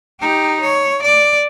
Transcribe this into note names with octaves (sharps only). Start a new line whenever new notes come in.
D#4 G4
C#5
D5